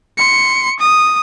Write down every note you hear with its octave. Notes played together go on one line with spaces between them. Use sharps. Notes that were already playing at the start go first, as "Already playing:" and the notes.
C6 C#7
D#6